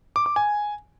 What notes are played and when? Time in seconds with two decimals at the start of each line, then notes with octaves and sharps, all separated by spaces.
0.16 D6
0.26 D6
0.36 G#5